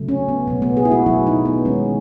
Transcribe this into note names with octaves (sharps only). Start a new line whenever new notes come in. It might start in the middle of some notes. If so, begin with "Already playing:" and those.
Already playing: C#3 F#3 A3
C#4
B3
B2 F#3 A3 C#4
B3
G#4
E4
F#4
B2 F#3 A3 E4
D#4
B3
D#3 G#3 C#4